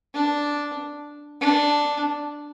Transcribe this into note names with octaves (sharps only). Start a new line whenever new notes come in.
D4
D4